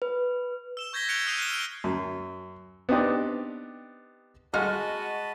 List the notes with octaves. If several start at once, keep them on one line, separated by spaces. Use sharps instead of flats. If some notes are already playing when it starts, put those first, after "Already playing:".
B4
E6 E7 G7
C#6 G6 G#6 A#6 B6 G7
F#6 G#6 C#7 D7 F7 G7
D#6 E6 F#6 C7 D#7 F7
F6 F#6 C7 D#7 E7 G7
E6 D7
F#2
B3 C4 D4 D#4 G4 D5
G#3 F#4 D#5 A5 B5 F6